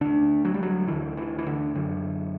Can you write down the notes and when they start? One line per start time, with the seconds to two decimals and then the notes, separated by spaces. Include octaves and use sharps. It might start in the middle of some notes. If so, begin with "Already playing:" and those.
0.01 D2 D3 D4
0.45 F#3
0.54 G3
0.63 F#3
0.88 D2 D3 E3
1.17 E3
1.38 E3
1.46 D3
1.75 F#2 D3